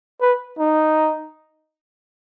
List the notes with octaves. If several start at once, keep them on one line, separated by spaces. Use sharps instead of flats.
B4
D#4